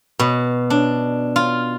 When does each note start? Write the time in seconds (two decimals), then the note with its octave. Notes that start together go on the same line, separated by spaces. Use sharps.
0.19 B2
0.70 D4
1.36 F4